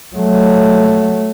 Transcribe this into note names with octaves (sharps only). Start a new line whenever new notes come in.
F#3 A3